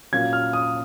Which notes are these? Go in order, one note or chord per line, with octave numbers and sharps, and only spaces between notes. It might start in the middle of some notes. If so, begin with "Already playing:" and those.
A#2 F#3 A#3 C#4 G#6
F6
D#6